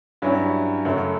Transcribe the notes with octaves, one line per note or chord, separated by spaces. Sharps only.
G2 F#3 C#4 E4
F#2 C#3 F#3 A3